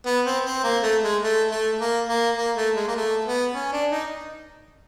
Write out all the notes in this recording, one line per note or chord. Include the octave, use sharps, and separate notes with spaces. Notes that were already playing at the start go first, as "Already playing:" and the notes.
B3
C4
C4
A#3
A3
G#3
A3
A3
A#3
A#3
A#3
A3
G#3
A#3
A3
B3
C#4
D4
D#4